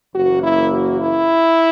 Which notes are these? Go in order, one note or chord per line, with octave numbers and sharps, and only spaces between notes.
F#1 F#2 E3 A#3 F#4
E4
F#4
E4